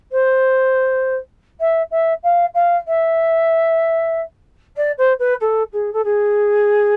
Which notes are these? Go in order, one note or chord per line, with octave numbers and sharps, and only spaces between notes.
C5
E5
E5
F5
F5
E5
D5
C5
B4
A4
G#4
A4
G#4